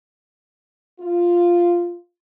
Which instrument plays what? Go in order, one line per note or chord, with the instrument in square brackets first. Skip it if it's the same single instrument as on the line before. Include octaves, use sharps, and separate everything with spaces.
[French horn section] F4